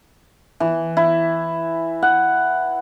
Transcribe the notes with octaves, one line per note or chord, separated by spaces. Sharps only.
E3
E4
F#5